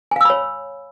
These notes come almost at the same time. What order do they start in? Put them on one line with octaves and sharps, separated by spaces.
G#5 F5 E6 B5 C#5